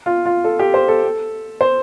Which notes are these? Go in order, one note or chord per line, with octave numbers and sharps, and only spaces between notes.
F4
F4
A4
G4
C5
A4
C5